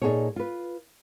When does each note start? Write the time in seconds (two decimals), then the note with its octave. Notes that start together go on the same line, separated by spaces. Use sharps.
0.02 A#2 D#4 F#4 G#4 A4 C#5
0.36 F4 B4